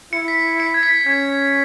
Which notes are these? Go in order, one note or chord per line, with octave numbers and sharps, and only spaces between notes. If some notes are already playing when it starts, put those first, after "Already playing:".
E4 C#7
B6
C#7
G#6
B6
B6
C#4 G#6